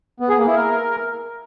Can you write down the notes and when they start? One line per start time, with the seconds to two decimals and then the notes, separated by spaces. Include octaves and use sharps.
0.20 B3
0.29 G#4
0.38 A#3
0.47 E4
0.56 A#4